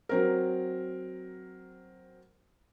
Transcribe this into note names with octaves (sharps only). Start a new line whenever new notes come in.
F#3 C4 A#4